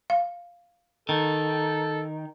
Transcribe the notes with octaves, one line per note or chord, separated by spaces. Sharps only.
F5
D#3 A4